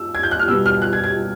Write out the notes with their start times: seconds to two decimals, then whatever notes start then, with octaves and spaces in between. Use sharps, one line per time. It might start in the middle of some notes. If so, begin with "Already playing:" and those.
Already playing: E6
0.15 G#6
0.23 G6
0.31 F#6
0.39 F6
0.48 B2 G3 B3 E6
0.66 F6
0.82 F#6
0.93 G#6
1.04 G#6